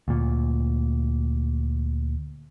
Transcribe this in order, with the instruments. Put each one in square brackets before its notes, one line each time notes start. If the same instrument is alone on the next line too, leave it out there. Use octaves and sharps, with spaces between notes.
[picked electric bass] D2 A#2